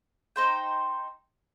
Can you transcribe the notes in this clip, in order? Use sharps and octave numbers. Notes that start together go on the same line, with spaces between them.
D#4 C5 G5